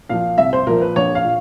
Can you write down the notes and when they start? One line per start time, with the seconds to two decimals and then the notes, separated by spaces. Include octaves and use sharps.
0.09 A#2 F3 F5
0.38 C2 E5
0.53 C5
0.67 A#2 F3 A#4
0.81 B4
0.96 A#1 C#5
1.15 F5
1.25 A#2